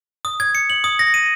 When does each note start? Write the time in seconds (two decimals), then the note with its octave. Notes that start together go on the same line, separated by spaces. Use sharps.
0.25 D#6
0.40 G#6
0.55 C#7
0.70 F#7
0.84 D#6
0.99 A#6
1.14 D#7